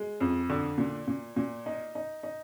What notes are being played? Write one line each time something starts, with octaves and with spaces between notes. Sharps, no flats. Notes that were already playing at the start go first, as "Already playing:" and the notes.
Already playing: G#3
F2
D3
A#2
A#2
A#2
D#4
D#4
D#4